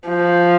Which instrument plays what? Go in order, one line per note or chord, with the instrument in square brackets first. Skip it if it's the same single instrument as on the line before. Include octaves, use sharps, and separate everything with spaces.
[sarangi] F3